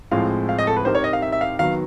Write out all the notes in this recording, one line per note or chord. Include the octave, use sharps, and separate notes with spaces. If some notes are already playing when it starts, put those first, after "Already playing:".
A2 F3 G#3 C4 F4 F5
F5
D#5
A4
B4
C4 D#4 G4 A#4 C5
C#5
D#5
F5
E5
E5
F5
D#3 F#3 B3 F5